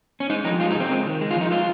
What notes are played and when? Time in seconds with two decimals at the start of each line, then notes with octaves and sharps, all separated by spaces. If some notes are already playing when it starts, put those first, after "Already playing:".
0.20 C#4
0.30 G#3 D#4
0.44 F3 D#4
0.60 G#3 F4
0.71 D#4
0.75 C#3
0.80 C4
0.90 G#3
1.06 D#3
1.21 G#3
1.31 F4
1.36 F3
1.41 D#4
1.51 G#3 F4